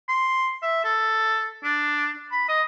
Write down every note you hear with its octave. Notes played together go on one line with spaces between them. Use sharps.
C6
E5
A4
D4
B5
D#5